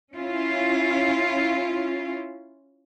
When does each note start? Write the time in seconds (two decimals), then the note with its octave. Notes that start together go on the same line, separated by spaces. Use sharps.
0.15 C#4 E4 F4